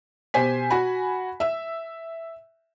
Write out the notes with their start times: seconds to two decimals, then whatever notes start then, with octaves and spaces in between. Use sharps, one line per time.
0.34 B2 G4 C5 G#5 B6
0.70 F#4 G#5 B5
1.40 E5 E6